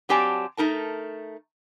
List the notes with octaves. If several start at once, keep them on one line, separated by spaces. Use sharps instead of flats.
F#3 C4 G4 D5 G#5 A5
A3 D#4 A#4 A5